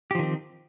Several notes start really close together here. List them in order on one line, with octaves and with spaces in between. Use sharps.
G4 F3 D#3 C4